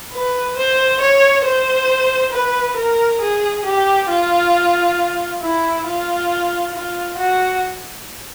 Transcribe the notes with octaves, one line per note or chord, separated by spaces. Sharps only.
B4
C5
C#5
C5
B4
A#4
G#4
G4
F4
E4
F4
F4
F#4